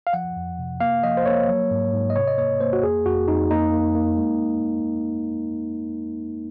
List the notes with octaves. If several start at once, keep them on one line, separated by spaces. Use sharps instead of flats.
F5
F3 F#5
F2
C3
A#3 F5
F3 D#5
C5
A#3 C#5
F#3
G#2
G#2
D#5
C3 C#5
D#5
A#3 C#5
A#3 C5
F#4
F2 G#4
F2 F#4
F2 D#4
A#3 D#4
A#3
A#3
G#3